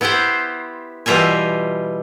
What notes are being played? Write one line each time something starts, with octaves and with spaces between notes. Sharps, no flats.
B3 E4 G4 B4 C5
B2 E3 G3 F4 E5 G#5